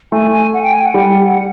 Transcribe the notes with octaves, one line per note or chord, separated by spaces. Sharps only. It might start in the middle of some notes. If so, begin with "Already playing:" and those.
A3 G#5
G#5
F#5
G5
G#5
F#5
G3